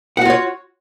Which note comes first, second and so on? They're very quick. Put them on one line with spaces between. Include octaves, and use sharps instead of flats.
F#5 F#4 F4 C#5